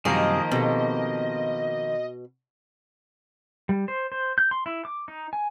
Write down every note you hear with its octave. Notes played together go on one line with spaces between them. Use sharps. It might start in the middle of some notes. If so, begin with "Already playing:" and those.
F#2 C3 D#3 F3 G3 A#3 G#4 D#5
B2 C4 G4 A4
G3
C5
C5
G6
C6
E4
D6
D#4
G#5